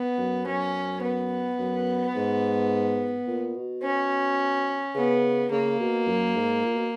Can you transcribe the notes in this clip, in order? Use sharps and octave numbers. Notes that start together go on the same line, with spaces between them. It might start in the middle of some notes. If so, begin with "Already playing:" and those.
Already playing: B3
F#2
F#2 C#4
B3
F#2
G#2
A#2
B2
C#4
C#3 B3
C#3 A#3
B2
F#2
G#2
A#2
B2